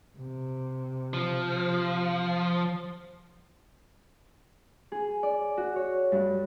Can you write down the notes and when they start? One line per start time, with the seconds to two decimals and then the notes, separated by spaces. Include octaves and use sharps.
0.18 C3
1.14 F3
4.92 G#4
5.23 D5
5.57 F#4
5.76 C#5
6.12 G2